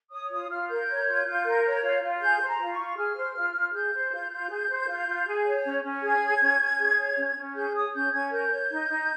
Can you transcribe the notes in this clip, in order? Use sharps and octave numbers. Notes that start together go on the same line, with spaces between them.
C#5 D#6
F4 D#6
F4 F6
A#4 G6
C#5
F4
F4
A#4
C#5
F4
F4
G#4 G6
C5
A#5
F4
C#6
F4
G#4 F6
C5
F4
F4
G#4 G6
C5
F4
F4
G#4
C5
F4
F4
G#4
C#5
C#4
C#4
G#4 G#6
C#5
C#4
C#4
G#4
C#5
C#4
C#4
G#4 G6
C#5 D#6
C#4 G6
C#4 G#6
A#4 G6
C#5
D#4
D#4